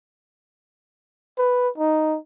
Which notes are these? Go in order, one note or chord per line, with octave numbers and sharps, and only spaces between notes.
B4
D#4